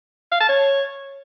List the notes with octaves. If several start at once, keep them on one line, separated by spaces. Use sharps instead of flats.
F5
A5
C#5